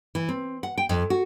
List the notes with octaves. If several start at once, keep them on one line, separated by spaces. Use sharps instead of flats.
E3
C4
F#5
G5
F2
F#4